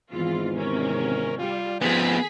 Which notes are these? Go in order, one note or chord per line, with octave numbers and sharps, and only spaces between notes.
G#1 E2 G#2 E3 F4
C3 C#4 A#4
G3 F4
F3 B3 C4 G#4 B6